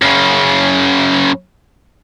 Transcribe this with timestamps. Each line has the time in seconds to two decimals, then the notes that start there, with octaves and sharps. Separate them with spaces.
0.02 F#2 C#3